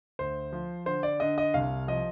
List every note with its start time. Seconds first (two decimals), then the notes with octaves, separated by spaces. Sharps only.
0.19 D2 C5
0.52 F3
0.86 D3 C5
1.03 D5
1.20 D3 D#5
1.38 D#5
1.54 C2 F5
1.88 F3 D#5